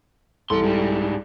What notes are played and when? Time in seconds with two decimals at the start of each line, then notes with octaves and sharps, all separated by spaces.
0.50 C2 E3 A4 C6
0.63 G#2 G3